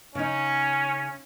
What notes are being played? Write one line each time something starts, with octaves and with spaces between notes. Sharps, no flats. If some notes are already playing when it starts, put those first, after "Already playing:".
C#3 C#4 D#4